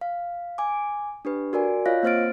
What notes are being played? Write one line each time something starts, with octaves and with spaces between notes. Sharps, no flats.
F5
G#5 D6
D4 G4 B4
F#4 A#4 D5 G#5
F4 C#5 D#5 F5 F#6 A#6
A#3 C4 C5 F6 A6 D7